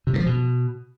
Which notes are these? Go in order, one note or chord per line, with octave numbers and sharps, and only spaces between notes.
C3
G2
F3
B2